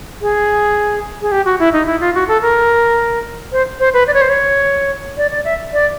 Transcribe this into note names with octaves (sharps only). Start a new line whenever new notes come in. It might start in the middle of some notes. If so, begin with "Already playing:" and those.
G#4
G#4
G4
F#4
E4
D#4
E4
F4
F#4
A4
A#4
C5
C5
B4
D5
C#5
C5
C#5
D5
D5
E5
D5